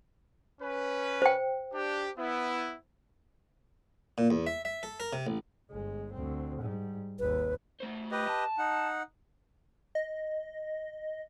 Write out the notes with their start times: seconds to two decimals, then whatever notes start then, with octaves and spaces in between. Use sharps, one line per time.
0.61 C#4 B4
1.22 C5 G5
1.72 D4 G4
2.18 B3 E4
4.18 A#2
4.30 E2
4.47 E5
4.65 E5
4.83 A4
5.00 A#4
5.13 C3
5.27 A1
5.70 G1 G#3
6.13 D2 C4
6.60 G#2 G3
7.19 G#1 D#2 B4
7.81 A3 C5
8.11 G4 B4 D#5
8.28 A5
8.58 D#4 F#5
9.95 D#5